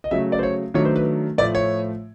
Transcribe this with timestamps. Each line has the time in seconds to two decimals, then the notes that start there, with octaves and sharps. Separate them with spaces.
0.04 D#5
0.11 C#3 F#3 A3 E5
0.32 D5
0.39 C5
0.43 C#5
0.74 D#3 F#3 A3 D4 C#5
0.85 C5
0.96 B4
1.38 A2 F3 A3 D5
1.55 C#5